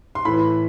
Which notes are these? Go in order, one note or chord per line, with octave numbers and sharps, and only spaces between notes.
C6
A2 E3 B5